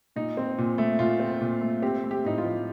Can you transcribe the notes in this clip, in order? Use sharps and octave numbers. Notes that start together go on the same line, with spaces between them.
A#2 D#4
C4
A#2
A3
A#2 F4
C4
A#2
A3
C4 G4
A3
G4
A2 D#4
F4
F3